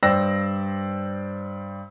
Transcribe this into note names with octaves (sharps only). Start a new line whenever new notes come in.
G2 C5 D5 G5 E6 A#6